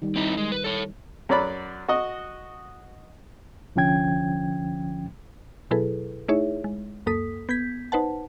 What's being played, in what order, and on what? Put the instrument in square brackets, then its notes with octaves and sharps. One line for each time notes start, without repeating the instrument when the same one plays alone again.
[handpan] D#3 G3
[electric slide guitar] C4 D#4 E4
G#3
B4
A4 C#5
[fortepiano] F#2 F#3 D5 B5
F#4 D#5
[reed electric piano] C2 D3 F3 C#4 G5 G#6
[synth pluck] B2 F#3 E4 G#4 A4 B4
A3 D#4 E4 G#4 C#5 E5
G#3
C#2 F#2 A#3 A4 D#6 B6
B3 G6 G#6 B6
D#4 B4 C5 F#5 A5